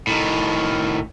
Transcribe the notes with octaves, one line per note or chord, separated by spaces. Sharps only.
A2 D#3